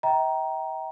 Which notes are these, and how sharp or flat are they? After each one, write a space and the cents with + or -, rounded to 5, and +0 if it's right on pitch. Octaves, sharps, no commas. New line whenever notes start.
E5 -45 G5 -20 A#5 +10